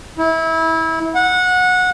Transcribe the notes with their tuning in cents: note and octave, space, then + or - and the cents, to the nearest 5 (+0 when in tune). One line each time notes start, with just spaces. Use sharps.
E4 -25
F#5 -20